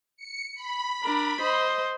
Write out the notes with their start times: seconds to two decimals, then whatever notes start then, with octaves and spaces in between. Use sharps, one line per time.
0.17 C#7
0.55 B5
1.04 D4 A#4
1.41 C5 D#5